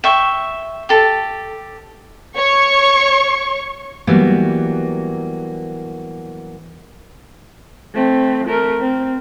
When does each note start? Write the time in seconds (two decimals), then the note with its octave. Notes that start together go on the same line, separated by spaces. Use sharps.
0.04 E5 G5 C#6
0.89 G4 A4
2.36 C#5 C#6
4.07 E3 F#3 G3 A#3 B3
7.94 A3 C4
8.47 A3 A#4
8.80 C4